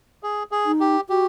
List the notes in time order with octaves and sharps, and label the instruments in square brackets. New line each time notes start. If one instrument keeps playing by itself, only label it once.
[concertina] G#4
G#4
[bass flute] D#4
[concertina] G4
[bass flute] F#4 [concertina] G4